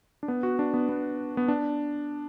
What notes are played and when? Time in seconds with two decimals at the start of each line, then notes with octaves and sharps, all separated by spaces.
0.23 D4
0.28 B3
0.43 F#4
0.59 D4
0.74 B3
0.89 B3
1.37 B3
1.48 D4